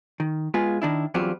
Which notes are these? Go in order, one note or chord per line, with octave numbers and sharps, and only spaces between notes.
D#3
G#3 B3 F4 G#4
D#3 D4 E4
E2 G2 F#3 G3 C4 F4